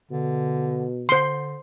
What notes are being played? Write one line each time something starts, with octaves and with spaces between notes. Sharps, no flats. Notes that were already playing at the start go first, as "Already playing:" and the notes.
B2 D3
D3 C5 C6